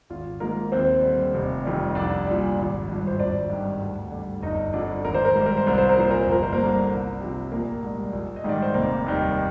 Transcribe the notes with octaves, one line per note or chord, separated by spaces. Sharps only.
G#1 F4
G#2 F3 A#3 A#4
D#2 C4 C5
D3 G3
F1
F2 D#3 G3
C2 D4 D5
A#2 G3
G#1
G2 F3
C5
G#1 D4 D5
G2 D#3 G3
D2
D3 G3
G1 D#4 D#5
F2 D3 F3 D4 D5
G#1 A#4
C5
A#4
G#2 G3 C5
A#4
C5
C2 A#4
C5
A#4
A#2 F3 C5
A#4
C5
G1 A#4
C5
A#3 A#4
G2 D3
C2
C3 F3
A#1 A#3 A#4
G#2 G3
A#1
D#5
G#2 D#3 G3 D5
C5
F1 A#3 A#4
D#2 D#3 G3